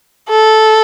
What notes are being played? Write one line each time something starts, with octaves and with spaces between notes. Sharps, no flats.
A4